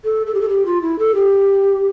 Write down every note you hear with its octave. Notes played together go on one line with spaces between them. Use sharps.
A4
A4
G4
A4
G4
F4
E4
A4
G4